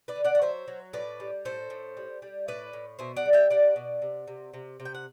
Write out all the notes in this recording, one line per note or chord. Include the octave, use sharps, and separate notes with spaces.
B4 D5
D3
D5 F#5
F#5
F#3 C5 E5
F#3
A2 B4 D5
G3
A2 A4 C5
A2
G3
G3
A2 B4 D5
A2
B2 C5 E5
D5 F#5
G3
E5 G5
G3 D5 F#5
B2
C3
C3
C3
C3
G5
F#5